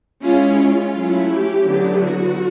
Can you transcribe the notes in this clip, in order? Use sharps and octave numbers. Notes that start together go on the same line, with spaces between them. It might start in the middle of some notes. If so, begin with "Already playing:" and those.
G#3 C#4 E4 F4
F4
F#3 A3 C#4 E4
G4
D3 F#3 B3 E4
F#4